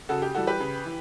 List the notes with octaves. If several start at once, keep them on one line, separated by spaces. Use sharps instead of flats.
C#3 F#4 A4
G4
E3 G3 F#4 A4
G4 B4
C#3
E3